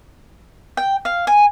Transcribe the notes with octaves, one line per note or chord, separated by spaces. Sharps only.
G5
F5
G#5